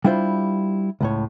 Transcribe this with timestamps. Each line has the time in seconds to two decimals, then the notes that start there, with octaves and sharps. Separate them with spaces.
0.04 G3 D4 E4 F4 C5
1.01 C#2 A2 C#5